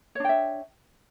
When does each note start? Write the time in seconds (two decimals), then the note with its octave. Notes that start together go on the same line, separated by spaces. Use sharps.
0.15 C#5
0.20 D4
0.24 G5
0.29 E5